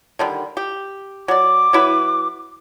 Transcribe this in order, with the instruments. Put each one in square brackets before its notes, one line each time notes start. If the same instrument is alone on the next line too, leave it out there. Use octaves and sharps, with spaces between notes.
[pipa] D3 D#3 G3
G4
[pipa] F#3 D5 [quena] D6
[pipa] F#3 E4 B4